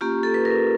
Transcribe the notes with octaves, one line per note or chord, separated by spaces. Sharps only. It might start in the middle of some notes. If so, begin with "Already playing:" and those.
A#3 C#4 F4 G4
A4
B4
A#4